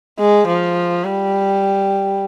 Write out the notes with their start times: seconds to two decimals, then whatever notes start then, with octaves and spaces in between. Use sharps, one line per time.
0.19 G#3
0.48 F3
1.05 G3